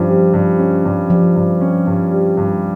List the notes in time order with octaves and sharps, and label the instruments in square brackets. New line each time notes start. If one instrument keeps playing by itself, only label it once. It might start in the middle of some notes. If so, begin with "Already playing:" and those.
Already playing: [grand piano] G2 C#4 [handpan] F3
[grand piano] G3
G2
C#4
G2
[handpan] F3 [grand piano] G3
[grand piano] G2
C#4
G2
G3
G2